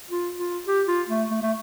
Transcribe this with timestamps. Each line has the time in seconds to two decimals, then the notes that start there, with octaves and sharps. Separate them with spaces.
0.10 F4
0.38 F4
0.67 G4
0.88 F4
1.09 A3
1.31 A3
1.41 A3